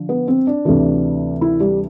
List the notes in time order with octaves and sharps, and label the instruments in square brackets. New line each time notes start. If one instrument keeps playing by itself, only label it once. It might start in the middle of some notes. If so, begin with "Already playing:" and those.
Already playing: [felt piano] D3 F3
B3
C4
D4
D2 C3 E3
E4
G3